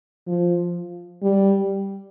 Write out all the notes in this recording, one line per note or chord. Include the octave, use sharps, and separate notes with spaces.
F3
G3